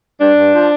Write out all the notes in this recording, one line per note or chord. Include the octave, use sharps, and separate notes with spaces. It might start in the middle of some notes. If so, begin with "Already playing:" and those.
G2 D4
G2
F3